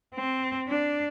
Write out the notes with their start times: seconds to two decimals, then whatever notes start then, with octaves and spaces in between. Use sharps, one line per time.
0.15 C4
0.68 D4